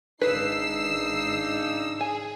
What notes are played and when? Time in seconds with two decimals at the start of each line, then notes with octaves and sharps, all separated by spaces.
0.21 G#1 C#3 D4 D#4 B4 E6 C7
2.01 G#4 G#5